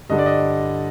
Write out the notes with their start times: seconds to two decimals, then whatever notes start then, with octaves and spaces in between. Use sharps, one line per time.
0.09 G2 D3 G3 D#5
0.19 D5
0.26 D#5